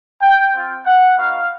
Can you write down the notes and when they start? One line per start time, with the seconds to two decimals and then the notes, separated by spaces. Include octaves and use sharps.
0.21 G5
0.53 C4 F4
0.85 F#5
1.16 B3 D#4 F#4 F5